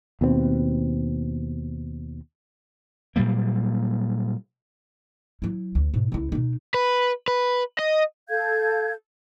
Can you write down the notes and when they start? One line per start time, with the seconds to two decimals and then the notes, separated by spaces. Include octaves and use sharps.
0.21 D#2 B2 B3 C4
3.16 A#2 F#3 G3 A#3
5.42 F#3 E4
5.75 D2
5.94 G#2 B2
6.12 C#2 E4
6.32 B2 D#4
6.74 B4
7.28 B4
7.79 D#5
8.29 A4 F5 G6 G#6